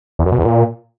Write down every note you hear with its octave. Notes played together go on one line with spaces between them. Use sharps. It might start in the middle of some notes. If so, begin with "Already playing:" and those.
E2
F#2
B2
E2
A#2